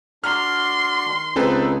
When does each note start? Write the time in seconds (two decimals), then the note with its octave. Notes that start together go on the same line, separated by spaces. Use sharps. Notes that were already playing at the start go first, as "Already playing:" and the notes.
0.24 D4 F#4 D5 C6 F6
1.06 D#3
1.36 C#2 C4 D#4 G#4 A4 B4 G#5